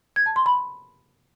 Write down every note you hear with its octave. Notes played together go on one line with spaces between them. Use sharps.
G#6
A5
C6
B5